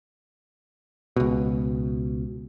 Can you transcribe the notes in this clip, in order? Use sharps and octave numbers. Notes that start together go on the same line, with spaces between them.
C#2 B2